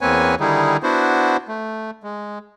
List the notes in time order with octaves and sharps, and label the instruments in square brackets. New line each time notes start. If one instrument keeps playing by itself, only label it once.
[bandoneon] E2 A#3 C4 B4 C#5 G#5
D3 D#3 G3 D#4 E4 G#4
B3 D4 E4 F#4 C5
A3
G#3